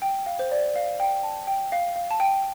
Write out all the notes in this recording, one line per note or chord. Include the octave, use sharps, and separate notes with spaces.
G5
F5
C5
D5
F5
G5
A5
G5
F5
F5
A5
G5